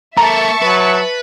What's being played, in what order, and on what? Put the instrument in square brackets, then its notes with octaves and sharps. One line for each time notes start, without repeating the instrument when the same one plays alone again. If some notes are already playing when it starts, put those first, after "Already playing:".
[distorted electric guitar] A#3 A4 [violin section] E5 A5 C#6 [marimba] A#5
[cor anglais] F#3 [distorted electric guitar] B4